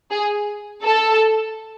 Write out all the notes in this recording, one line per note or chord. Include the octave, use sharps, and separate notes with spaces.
G#4
A4